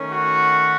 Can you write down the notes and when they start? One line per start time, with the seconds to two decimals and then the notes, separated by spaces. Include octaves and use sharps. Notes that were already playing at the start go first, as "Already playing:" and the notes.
Already playing: D#3 A3 C#4
0.13 F#4